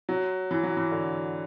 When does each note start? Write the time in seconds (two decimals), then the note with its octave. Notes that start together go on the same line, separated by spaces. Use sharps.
0.09 F#3
0.51 E3
0.63 F#3
0.77 E3
0.91 D3